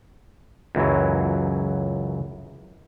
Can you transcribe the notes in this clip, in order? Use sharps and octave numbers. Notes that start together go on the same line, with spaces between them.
C#2 F#2 E3 F#3